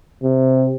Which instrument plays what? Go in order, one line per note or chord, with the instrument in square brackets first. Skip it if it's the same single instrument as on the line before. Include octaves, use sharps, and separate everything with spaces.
[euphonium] C3